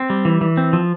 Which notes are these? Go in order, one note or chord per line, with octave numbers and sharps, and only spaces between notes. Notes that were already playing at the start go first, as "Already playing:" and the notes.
Already playing: C4
G3
E3
E3
C4
F3